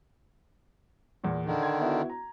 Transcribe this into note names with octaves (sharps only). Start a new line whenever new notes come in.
E2 A#2
D3 D#3
G5 C6 G#6
B3 E4 F#4
A#5